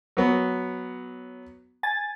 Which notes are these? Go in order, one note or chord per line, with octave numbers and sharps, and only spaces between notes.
F#3 B3
G#5 A6